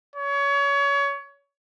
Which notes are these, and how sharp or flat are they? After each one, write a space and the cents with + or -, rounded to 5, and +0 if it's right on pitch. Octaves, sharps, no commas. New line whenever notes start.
C#5 +30